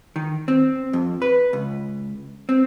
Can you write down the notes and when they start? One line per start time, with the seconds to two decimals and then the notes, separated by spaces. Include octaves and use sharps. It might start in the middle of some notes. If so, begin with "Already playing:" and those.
0.16 D#3
0.48 C4
0.93 F2
1.22 B4
1.53 C#2
2.49 C4